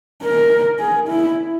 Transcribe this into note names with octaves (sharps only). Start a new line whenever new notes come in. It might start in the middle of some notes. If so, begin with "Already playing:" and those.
A#4
G#4
E4